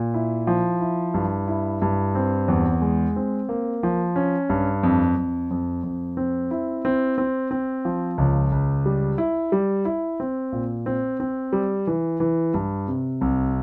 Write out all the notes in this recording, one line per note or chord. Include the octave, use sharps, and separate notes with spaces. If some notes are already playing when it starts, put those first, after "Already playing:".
Already playing: A#2
E4
F3
E4
G2
E4
G2
C4
E2
G#3
C4
A#3
F3
C#4
G2
F2
F2
F2
F2
C4
E4
C4
C4
C4
F3
C#2
C#2
G3
E4
G3
E4
C4
A#2
C4
C4
G3
E3
E3
G2
C3
C2